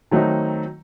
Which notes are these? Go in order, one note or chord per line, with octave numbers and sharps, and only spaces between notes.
D#3 F#3 A3 C4 D#4